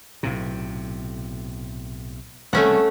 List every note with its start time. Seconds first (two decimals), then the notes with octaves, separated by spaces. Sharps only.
0.23 B1 A2 C3
2.53 C2 C#3 A3 C#4 F#5